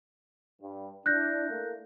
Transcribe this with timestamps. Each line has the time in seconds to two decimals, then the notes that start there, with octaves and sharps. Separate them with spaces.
0.62 G2
1.06 D4 E4 F#6 G6 A#6
1.50 A3 A#3